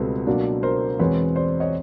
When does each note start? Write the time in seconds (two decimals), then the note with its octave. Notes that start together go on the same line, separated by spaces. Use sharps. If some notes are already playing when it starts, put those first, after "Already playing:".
Already playing: C#2 B2 G3 C4 A4 B4
0.27 B2 F#3 A#3 D4
0.63 A#4 C5
0.99 E2 B2 G#3 C4 B4 C#5
1.36 C5 D5
1.60 C#5 D#5